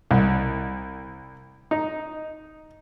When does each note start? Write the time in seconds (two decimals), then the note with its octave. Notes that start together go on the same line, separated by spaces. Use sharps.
0.11 C2
1.71 D#4